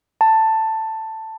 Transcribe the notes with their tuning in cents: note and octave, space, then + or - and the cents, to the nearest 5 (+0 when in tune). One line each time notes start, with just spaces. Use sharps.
A5 +10